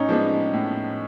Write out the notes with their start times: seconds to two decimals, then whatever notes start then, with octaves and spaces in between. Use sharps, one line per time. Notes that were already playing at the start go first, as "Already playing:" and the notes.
Already playing: A2 C#4 D#4
0.09 F3 G#3 B3 D4
0.53 A2